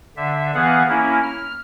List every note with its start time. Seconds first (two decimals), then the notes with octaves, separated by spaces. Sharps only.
0.16 D3 E5
0.54 E3 B3 G#4 F5 F#5
0.89 A#3 C#4 E4
1.23 F6